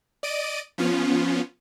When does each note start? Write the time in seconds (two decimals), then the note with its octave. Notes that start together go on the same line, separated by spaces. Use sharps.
0.23 D5 D#5 D7 D#7
0.78 F3 B3 C#4 F4